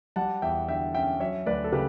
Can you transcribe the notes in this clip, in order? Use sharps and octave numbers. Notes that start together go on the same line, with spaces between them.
G3 F#5 A5
E2 E5 G5
D3 E5 G5
C#4 E5 G5
F#3 C#5 E5
D2 B4 D5
A4
C#3 G4 B4